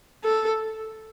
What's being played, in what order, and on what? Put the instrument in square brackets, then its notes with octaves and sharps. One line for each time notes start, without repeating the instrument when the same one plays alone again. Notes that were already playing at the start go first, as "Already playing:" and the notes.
[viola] A4